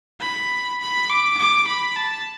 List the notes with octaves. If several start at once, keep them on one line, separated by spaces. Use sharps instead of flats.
B5
B5
D6
D6
B5
A5